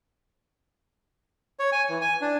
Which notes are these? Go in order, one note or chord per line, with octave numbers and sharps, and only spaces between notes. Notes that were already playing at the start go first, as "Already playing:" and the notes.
C#5
G#5
E3
G#5
D4